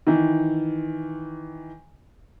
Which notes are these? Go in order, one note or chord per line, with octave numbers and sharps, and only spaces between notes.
D#3 E3